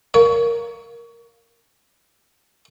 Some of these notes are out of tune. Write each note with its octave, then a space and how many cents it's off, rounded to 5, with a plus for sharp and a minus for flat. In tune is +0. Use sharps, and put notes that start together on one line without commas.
A#3 +0 C#5 +25